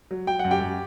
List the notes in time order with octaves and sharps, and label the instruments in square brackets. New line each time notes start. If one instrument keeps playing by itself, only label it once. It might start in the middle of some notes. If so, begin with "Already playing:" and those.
[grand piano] F#3
F#3 G5
F#5
F#2
G4 G5
F#2